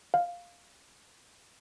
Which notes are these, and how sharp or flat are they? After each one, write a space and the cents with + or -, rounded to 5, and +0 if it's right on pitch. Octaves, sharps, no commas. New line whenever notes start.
F5 +5